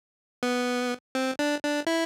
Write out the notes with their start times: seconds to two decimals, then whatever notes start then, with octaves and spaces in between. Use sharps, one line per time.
0.43 B3
1.15 C4
1.39 D4
1.64 D4
1.87 E4